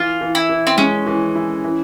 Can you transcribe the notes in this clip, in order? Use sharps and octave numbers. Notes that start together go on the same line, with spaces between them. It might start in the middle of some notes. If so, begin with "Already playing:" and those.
Already playing: E3 F4
E3
E4
E3
C4
G#3 C#4
E3
E4
E3